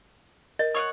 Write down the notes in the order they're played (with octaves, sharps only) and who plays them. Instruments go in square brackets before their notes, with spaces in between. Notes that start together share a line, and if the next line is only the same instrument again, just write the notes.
[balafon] A#4 [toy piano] D#5
[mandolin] C#5 F5 F#5 [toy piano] D#6